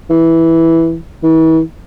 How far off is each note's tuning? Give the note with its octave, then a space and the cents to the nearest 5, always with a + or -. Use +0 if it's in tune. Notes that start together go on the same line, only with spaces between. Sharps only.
E3 -5
E3 -40